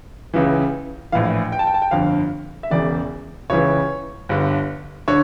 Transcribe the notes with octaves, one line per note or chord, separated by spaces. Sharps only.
C#2 C#3 E3
A#1 A2 E3 F5
G5
A5
G5
A5
G5
G1 F2 D3 F5
E5
E1 E2 C#3 D5
C#2 C#3 E3 C#5
G1 G2 D3
D3 C#5